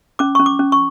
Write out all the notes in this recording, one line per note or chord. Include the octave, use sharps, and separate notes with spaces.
C#4 D6
C#4 C#6
D6
C#4
C#6